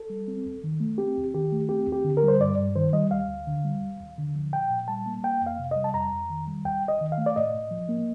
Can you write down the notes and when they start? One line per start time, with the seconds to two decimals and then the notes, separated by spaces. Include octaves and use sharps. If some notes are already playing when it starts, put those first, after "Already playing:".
Already playing: A4
0.10 G3
0.28 C4
0.45 D#2
0.64 D#3
0.80 A3
0.98 C4 G4
1.17 D#2
1.34 D#3 G4
1.52 A3
1.69 C4 G4
1.87 D#2
1.92 G4
2.04 D3
2.17 A#4
2.23 G3
2.28 C5
2.40 G2 D5
2.58 G2
2.75 D#3 C5
2.93 G3 D#5
3.11 D2 F5
3.28 D2
3.47 D3
3.64 G3
3.81 D#2
4.00 D#2
4.18 D3
4.35 F3
4.52 A#2 G5
4.70 A#2
4.88 G3 A5
5.06 A#3
5.23 A#3 G5
5.41 F2
5.47 F5
5.59 C3
5.71 G3 D#5
5.84 A5
5.94 F2 A#5
6.11 F2
6.30 D#3
6.47 G3
6.65 D#2 G5
6.83 D#2
6.88 D#5
7.01 D#3
7.12 F5
7.18 A3
7.26 D5
7.36 A2 D#5
7.54 A2
7.71 F3
7.89 A#3